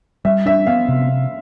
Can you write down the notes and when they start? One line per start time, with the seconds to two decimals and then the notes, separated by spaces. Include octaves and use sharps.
0.25 G3 E5
0.46 D4 E5
0.67 B3 F5
0.89 C3